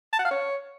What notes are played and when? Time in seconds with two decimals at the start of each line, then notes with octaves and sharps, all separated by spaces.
0.13 A5
0.19 F#5
0.25 F5
0.31 C#5